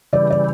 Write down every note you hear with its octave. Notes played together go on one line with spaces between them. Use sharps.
C#3 E3 G3 D5
D5